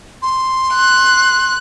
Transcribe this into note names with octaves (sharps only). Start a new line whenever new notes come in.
C6
F#6